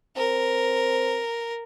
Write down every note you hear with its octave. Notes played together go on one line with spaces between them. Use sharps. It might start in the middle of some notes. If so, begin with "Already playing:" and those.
C4 A#4